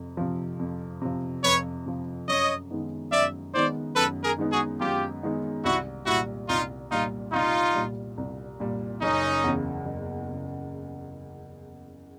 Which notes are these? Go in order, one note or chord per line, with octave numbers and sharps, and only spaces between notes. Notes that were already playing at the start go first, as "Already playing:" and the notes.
Already playing: F2 C3
C3 F3
F2
C3 F3
F2 B4 C#5
C3 F3
F#2 C#5 D#5
D#3 G#3 B3 D#4
F#2 D5 E5
D#3 G#3 B3 D#4 C5 D5
F#2 A4 B4
G#4 A#4
D#3 G#3 B3 D#4
F#4 G#4
F#2 F4 G4
D#3 G#3 B3 D#4
C2 E4 F#4
A#2 G3 E4 F#4
C2 D#4 F4
A#2 G3 D#4 F4
C2 D#4 F4
A#2 G3
C2
A#2 G3
F#1 C#4 D#4
E2 C#3
F#1
C#3